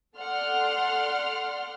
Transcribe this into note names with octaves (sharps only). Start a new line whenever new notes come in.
A4 D5 F#5 C6 F6